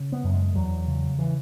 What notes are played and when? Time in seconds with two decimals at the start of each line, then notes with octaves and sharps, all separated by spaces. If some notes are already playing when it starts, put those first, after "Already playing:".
Already playing: C#3
0.12 B3
0.24 F#2
0.34 G#3
0.55 E2 F#3
0.87 C#3
1.19 E3